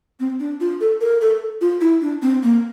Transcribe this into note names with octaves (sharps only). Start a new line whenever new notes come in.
C4
D4
F4
A4
A#4
A4
F4
E4
D4
C4
A#3